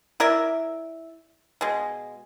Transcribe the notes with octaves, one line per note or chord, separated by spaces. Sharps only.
E4 A#4 D5 E5
B2 G#3